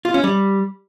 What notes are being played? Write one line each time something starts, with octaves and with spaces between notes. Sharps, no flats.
F4
C#4
G3